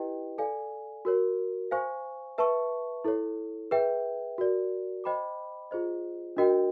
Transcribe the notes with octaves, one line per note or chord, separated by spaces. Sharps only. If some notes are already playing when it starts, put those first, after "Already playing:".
Already playing: E4 G4 B4 D#5 G5
A4 D5 F5 G#5
F#4 A#4 C#5
C5 F5 G#5 C#6
B4 E5 A5 C#6
E4 A4 C#5
G#4 B4 E5 G5
F#4 A#4 D5
C5 D#5 G5 B5 D6
F4 G#4 C5 D#5
D4 F#4 A#4 D#5 G5